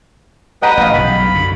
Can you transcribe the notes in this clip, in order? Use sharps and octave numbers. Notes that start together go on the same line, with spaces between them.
B4 D#5 F#5 G5 A#5 D#6
A1 D#5 F5
B1 G2 C#3 B5
F#2 D3